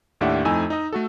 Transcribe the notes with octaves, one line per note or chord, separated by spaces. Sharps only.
D#2 A2 D4 G4 E5 F#5
F2 A3 D#4 E4 G#5 E6
D#4 D#5
A3 F#4 A4